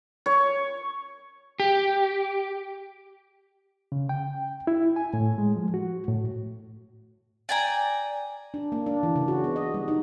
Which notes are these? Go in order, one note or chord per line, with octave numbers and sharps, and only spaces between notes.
C#5
G4
C#3
G5
E4
G#5
A2
G#3
F3
F#4
A2
D5 G5 G#5 A#5
D4
A#3
D4
E3
C#3
F#4
B3
D#5
G3
D#4